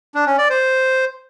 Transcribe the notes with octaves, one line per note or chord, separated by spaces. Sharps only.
D4
C#4
D5
C5